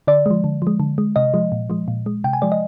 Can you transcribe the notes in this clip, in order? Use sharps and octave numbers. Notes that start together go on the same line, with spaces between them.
D3 D5
F3 G#3
D3
F3 G#3
D3
G#3
C3 D#5
F3 G#3
A#2
F3 G#3
A#2
G#3
C3 G5
G#5
F3 G#3 D5
D#5